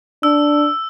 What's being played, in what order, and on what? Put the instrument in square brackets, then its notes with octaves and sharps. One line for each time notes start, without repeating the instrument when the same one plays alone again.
[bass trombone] D4 [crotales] E6